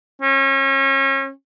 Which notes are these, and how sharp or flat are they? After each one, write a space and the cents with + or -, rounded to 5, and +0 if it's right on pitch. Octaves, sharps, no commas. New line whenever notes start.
C#4 -35